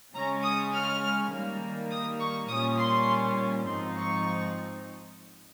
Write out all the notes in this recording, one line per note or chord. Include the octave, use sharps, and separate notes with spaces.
C#3 G#3 C#4 A#5
D#6
F6
D#3 G3 A#3
D#6
C#6
A#2 G3 C#4 D#6
C6
G#2 F3 C4 D#4 C6
C#6